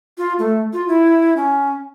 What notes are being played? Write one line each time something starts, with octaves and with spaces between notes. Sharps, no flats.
F4
A3
F4
E4
C#4